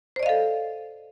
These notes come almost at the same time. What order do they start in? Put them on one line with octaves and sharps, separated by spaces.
C5 D5 D#5 F5 A4